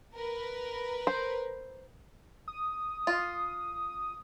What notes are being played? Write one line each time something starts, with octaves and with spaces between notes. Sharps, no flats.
A#4 B4
C5
D#6
F4